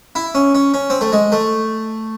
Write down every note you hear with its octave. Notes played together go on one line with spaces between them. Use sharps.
E4
C#4
C#4
C#4
C4
A3
G#3
A3